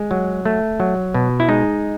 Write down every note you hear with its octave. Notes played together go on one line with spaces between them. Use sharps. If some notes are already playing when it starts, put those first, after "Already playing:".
Already playing: G#3
F#3
A3
F#3
B2
E4
G#3 D#4